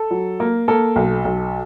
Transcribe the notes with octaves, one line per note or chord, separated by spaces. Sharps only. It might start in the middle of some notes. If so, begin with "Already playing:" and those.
Already playing: A4
F#3
A#3
A#3 A4
B1
B1